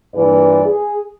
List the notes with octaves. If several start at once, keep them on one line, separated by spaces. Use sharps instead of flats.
G2 A#2 E3 B4 D5
G#4